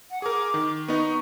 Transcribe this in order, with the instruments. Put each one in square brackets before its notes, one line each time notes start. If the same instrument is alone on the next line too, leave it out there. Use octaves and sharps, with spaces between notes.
[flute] F#5
[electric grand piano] G#4 A#4 [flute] D6
[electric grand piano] D#3
[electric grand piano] B3 D#4 [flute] C#6